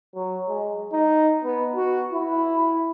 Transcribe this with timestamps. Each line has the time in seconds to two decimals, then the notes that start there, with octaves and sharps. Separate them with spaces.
0.15 F#3
0.48 G#3
0.92 D#4
1.44 B3
1.76 F#4
2.13 E4